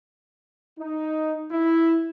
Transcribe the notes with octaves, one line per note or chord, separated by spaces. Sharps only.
D#4
E4